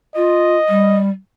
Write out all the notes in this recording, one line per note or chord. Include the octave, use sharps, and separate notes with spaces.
F4 D#5
G3